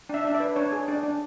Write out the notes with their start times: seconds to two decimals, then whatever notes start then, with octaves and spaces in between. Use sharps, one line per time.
0.09 D4 E5
0.25 D4 E5
0.35 D5
0.40 B4
0.56 D4 C#5
0.72 G#4
0.88 D4 D5
1.03 D4